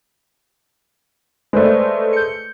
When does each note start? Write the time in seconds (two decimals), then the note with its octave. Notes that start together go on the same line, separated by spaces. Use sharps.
1.53 G#3 A3 B4 C5 D5
2.13 G6 C#7